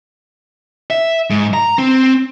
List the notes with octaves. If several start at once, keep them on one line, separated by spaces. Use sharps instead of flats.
E5
G#2
A#5
C4